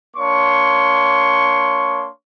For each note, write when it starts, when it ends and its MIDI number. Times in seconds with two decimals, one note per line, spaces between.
0.16 2.08 58
0.16 2.08 62
0.16 2.08 73
0.16 2.08 84
0.16 2.08 85